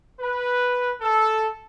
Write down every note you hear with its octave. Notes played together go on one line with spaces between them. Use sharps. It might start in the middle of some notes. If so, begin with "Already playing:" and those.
B4
A4